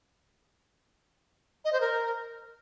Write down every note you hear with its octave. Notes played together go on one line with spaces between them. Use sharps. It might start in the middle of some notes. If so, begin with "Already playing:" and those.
D#5
C5
A#4